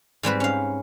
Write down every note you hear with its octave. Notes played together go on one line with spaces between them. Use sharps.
G#2 G3 C4 B4
C#4 F5